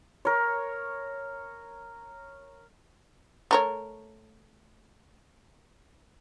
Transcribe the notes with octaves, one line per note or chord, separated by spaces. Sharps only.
A#4 C#5
A3 A#4 C#5